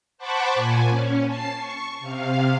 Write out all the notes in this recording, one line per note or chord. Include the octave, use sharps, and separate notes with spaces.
C5 F#5 A5 B5 C#6 D6
A#2 G#5
C#4
A5 C7
C#6
C3 F5